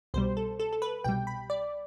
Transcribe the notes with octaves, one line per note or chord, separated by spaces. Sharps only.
C2 B2 G3 C5
A4
A4
A4
B4
C2 B2 G3 G5
B5
D5